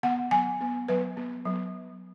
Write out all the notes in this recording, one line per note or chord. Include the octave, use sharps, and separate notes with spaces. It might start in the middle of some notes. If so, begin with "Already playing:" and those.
B3 F#5
F#3 G#5
B3
F#3 B4
B3
F#3